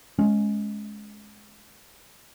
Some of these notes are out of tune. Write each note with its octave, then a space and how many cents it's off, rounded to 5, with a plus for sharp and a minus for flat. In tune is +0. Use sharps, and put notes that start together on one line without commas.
G#3 +15 C#4 +0